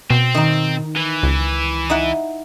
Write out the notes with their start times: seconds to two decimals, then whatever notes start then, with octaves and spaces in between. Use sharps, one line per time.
0.10 B2 C4
0.34 D#3 D#4
0.97 E3
1.23 C#2
1.90 D#4 E4 F#5